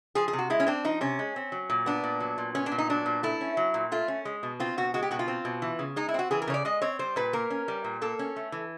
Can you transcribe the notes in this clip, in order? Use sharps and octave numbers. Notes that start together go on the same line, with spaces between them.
F3 G#4
G#4
C3
F#4
G#3 E4
C#4
C4 D4
F3 D#4
C3 C#4
G#3
C4
F#3
A#2
B3 D4
A#2
F#3
A#2
B3 C#4
D4
A#2
D#4
F#3 D4
A#2
A3 E4
C#4
F#3
A#2
A3 F4
C#4
G#3
B2
C4 F4
B2 F#4
G#3 F#4
G4
B2 F#4
F4
C4
B2
E3
C#3
G#3 D#4
E4
C4 F#4
E3 G#4
A#4
C#3 C#5
D5
G#3 D#5
C4 C#5
G3 C5
A#2 B4
A#3 A#4
C#4
G3
A#2
A#3 A4
C#4
A3
E3